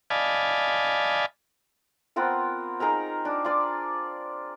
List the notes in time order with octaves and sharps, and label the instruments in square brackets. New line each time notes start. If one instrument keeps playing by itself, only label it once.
[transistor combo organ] D5 D#5 F5 G#5 A5 B5
[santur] B3 C4 F4 A#4
D#4 G#4 A#4 A#5
D4
F4 D5